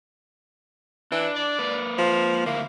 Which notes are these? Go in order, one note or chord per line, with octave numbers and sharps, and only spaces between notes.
E3 D4
D5
A#3 B4
F3
D2 A#3 E4